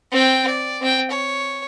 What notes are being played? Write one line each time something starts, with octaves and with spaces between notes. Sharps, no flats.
C4 G5
D5
C4 G5
C#5